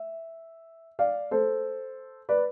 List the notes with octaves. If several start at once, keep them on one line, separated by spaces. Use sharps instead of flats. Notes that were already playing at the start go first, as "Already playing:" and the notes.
Already playing: E5
D5 F5
A4 C5
B4 D5